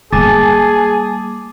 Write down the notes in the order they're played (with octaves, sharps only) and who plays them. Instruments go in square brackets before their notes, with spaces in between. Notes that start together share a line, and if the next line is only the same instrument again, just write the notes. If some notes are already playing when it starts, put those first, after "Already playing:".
[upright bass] G3 A#3 [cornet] G#4 [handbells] G#5 A5 A6 [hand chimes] D6